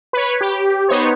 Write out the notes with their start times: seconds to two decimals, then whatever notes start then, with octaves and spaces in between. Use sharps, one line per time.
0.13 B4 C#5
0.41 G4
0.88 B3 D#4 C5 C#5